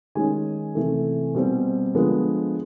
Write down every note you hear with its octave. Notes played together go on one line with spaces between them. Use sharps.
D#3 G#3 C#4 G#5
C3 E3 A3
B2 G3 C4
D3 F3 G#3 B3